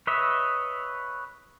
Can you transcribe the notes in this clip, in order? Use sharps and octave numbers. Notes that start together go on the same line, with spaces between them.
B4 C#5 D#5 E5